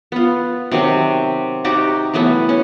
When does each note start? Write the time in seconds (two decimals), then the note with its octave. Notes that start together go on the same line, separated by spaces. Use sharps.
0.12 B3 F4
0.71 C3 D#3 F#3 C4
1.64 D#4 F#4 G4 A#5
2.14 E3 F#3 A3 B3
2.49 C#4